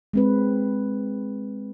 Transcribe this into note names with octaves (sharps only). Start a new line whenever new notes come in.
G#3 C4 B4